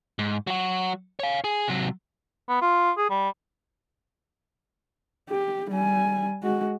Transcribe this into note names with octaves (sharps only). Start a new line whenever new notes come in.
G#2
F#3 F#4
C#5 F5
G#4
C3 F#3
B3
F4
G#4
G3
G4
G3 G#5
G#3 F#4